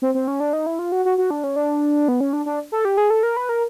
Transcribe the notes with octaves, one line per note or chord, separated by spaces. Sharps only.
C4
C4
C#4
D4
D#4
E4
F4
F#4
F#4
F#4
D4
C#4
D4
B3
C#4
D4
D4
A4
G4
G#4
A4
A#4
B4
A#4